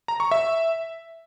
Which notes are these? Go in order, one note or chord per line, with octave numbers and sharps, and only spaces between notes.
A#5
C#6
E5